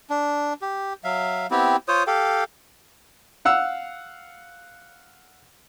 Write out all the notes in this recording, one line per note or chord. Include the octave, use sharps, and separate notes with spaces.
D4
G4
F#3 E5 F5
B3 C4 E4 G4
F4 C5 C#5 D#6
G4 A4 F5 G5
F5 F#5 E6